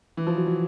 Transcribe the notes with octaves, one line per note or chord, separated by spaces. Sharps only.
E3
F3
F#3
F#3